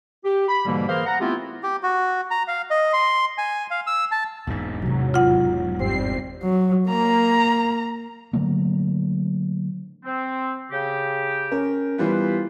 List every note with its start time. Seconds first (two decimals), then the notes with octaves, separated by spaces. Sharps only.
0.24 G4
0.49 B5
0.65 G#2 B2 D3 E3 G3 A#3
0.88 E3 A#3 G#4 A#4 C5 F5
1.06 F#5 A#5
1.20 A3 B3 C4 E4 F4 G4
1.63 G4
1.83 F#4
2.31 A#5
2.48 F5
2.70 D#5
2.93 C6
3.38 G#5
3.71 F5
3.87 E6
4.12 A5
4.47 E1 G#2 E3 A#3
4.82 D#2 C3 F#3
5.14 F4 F#5
5.79 G1 G3 C4 C7
6.43 F#3
6.89 A#3 A#5
8.33 D3 F#3 A3 A#3
10.05 C4
10.71 C#3 G4
11.51 C#4 A#4
11.98 E3 G3 B3 F4 B4 C5